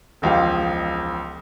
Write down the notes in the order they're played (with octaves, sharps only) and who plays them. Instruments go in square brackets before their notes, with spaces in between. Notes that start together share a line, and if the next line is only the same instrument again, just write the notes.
[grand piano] E1 C#2 F3 G4 F5